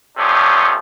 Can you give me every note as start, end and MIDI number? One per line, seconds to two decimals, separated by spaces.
0.17 0.76 42
0.17 0.76 48
0.17 0.76 53
0.17 0.76 57
0.17 0.76 61
0.17 0.76 62